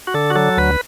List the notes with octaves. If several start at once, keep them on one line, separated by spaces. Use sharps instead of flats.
F#4
D3 A4
F#4
F#3 A4
D2 B4